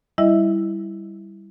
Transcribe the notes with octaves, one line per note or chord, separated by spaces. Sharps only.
G3 E4 D#5 E5